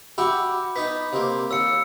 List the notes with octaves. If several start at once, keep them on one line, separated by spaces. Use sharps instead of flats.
F#4 G4 E5 B5 D6
B3 D#4 B6
C3 A#3
D#2 E6 C#7